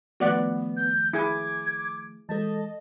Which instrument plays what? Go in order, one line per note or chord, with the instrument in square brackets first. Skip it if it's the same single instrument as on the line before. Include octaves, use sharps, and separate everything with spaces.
[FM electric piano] D#3 F3 A3 [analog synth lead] B3 [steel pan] F#4 D5 F#5
[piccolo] G6
[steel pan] E4 G#4 G#5 [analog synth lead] D6 [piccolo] G#6
[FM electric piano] E3 G#3 A4 [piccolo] D#5 [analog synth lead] A5